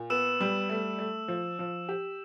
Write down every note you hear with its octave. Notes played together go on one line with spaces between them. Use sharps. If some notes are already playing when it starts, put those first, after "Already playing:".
Already playing: A#2
B3 E6 E7
G3
A3
A3
F3
F3
G4